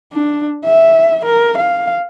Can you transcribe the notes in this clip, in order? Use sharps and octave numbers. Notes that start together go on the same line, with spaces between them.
D4
E5
A#4
F5